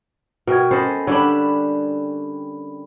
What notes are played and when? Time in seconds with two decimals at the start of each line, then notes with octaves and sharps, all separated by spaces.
0.47 B2 A#4 G5 G#6
0.71 C#4 A4 C5 D#5 B5
1.07 D3 G3 D4 C#5 B5